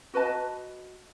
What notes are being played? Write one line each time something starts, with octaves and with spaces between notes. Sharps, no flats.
F#4 B4 D#5 A5